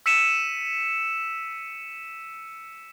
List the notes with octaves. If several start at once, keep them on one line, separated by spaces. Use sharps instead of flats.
E6 B6 C#7 D#7 E7